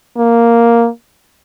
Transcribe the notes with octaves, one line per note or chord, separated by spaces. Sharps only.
A#3